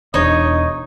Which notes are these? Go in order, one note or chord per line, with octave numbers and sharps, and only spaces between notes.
E1 E2 D4 D#4 C#5 D#5